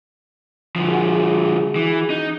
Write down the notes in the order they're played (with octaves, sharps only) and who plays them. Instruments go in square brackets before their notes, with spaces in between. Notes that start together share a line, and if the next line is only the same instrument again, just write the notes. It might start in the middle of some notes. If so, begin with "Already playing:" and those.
[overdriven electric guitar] D3 F3
[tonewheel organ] F#4 G#4
[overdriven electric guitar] E3
D#4